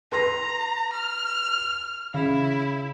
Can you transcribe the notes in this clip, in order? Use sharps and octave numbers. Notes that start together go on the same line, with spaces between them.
B4 A#5 C6 A#6
F6
C#3 E4